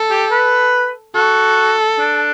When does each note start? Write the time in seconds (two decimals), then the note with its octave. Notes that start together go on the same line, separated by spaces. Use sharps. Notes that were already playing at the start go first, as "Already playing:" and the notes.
Already playing: A4
0.10 G4
0.31 B4
1.15 F#4 A4
1.99 D4